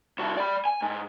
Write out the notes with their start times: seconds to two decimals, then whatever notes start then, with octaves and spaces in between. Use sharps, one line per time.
0.19 C2 F#4
0.37 D5 B5
0.65 G#5
0.82 G#2